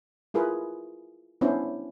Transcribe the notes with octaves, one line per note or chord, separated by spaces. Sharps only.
E4 F4 G#4 A#4 B4
B3 C#4 D4 E4 C5